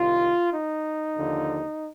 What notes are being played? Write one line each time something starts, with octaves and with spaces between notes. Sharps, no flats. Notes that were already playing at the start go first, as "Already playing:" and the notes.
Already playing: C2 C3 D#3 F4
D#4
D#2 D3 F3